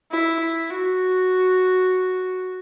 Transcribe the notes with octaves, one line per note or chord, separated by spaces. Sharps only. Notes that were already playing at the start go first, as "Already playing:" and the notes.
E4
E4
F#4